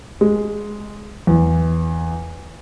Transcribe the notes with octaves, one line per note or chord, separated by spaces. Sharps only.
G#3
E2